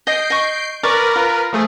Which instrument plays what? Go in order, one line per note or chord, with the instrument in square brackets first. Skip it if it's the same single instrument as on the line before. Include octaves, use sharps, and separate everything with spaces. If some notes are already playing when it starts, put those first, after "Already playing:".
[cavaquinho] D#5 D#6 [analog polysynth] G6 C7 D7
[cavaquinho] D#5 C#6
[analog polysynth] A#4 B4 [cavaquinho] D5 C#6
[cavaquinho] F4
[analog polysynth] F3 A3 G#4